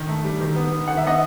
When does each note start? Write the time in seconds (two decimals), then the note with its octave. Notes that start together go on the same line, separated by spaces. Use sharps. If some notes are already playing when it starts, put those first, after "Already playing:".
Already playing: D#3
0.08 A3
0.24 G3
0.41 D#3
0.56 B3
0.72 B3
0.87 D#3 F#5
0.97 E5
1.03 B3 D#5 F#5